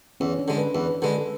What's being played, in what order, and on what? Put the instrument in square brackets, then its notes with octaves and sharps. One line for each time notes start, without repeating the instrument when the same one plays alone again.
[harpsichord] E2 [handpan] C#4
[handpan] D4
[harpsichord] D3 G#3
[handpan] B4
[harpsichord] E2 [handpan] B4
[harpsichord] D3 G#3 [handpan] B4
[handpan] A4